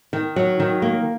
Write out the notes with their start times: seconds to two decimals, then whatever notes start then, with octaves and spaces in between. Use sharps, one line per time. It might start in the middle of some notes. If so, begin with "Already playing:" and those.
0.13 D#3
0.36 F#3
0.60 D#3
0.82 A#3